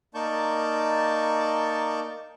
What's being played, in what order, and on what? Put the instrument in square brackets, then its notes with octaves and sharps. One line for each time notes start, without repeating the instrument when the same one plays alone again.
[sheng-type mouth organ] A#3 D#4 D5 A5 C#6 G6